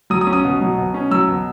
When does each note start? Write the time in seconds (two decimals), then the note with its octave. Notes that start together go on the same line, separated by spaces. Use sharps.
0.10 F#3 D#6
0.21 D#6
0.27 C#4
0.33 D#6
0.45 B2
0.61 F#3
0.78 B2
0.94 C#4
1.11 F#3 E6
1.28 B2